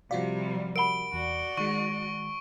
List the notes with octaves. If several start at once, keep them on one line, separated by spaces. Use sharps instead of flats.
C3 F3 G3 F#4 D5 F5
A#4 F#5 B5 D7 G7
E2 F#4 D5
D#3 G#3 C#6